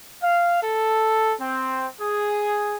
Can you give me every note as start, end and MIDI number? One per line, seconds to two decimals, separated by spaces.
0.23 0.61 77
0.63 1.35 69
1.40 1.87 60
2.01 2.77 68